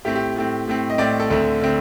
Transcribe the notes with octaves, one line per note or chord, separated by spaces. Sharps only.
A2 A3 C4 G4
G4
A2 A3 C4
A2 A3 C4
D#5
A2 A3 C4 D5
A4
D2 D3 A3 C4 A4
D3 A3 C4